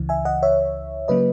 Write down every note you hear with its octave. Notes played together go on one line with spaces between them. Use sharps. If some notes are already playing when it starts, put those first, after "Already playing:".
Already playing: C#2 C#3 E3
E5 G#5
D#5 F#5
C#5 E5
C#3 F#3 A#3 C#4 B4 D#5